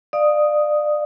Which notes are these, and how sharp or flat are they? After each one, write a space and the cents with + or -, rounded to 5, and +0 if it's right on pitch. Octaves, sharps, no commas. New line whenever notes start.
D5 +25 F5 +0 D#6 +0